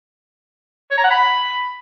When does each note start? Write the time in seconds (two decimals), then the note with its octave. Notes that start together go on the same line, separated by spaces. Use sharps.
0.91 C#5
0.97 A#5
1.04 F#5
1.11 B5